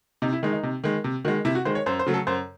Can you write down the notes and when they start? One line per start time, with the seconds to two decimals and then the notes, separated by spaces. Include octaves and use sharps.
0.22 C3 D#4
0.33 E4
0.43 D#3 G#3 D#4
0.53 D#4
0.63 C3
0.84 D#3 G#3
1.04 C3
1.25 D#3 F#4
1.28 G#3
1.45 C3 E4
1.55 F#4
1.65 D#3 G#3 C5
1.75 C#5
1.86 F#2 C5
1.99 C5
2.06 C#3 F#3 A3
2.14 A4
2.27 F#2 C5